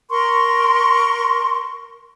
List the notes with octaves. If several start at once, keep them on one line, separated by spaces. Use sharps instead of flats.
A#4 C6 C#6